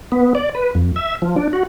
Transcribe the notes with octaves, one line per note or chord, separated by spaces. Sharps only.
B3
D5
B4
F2
E5
F3
D4
F#4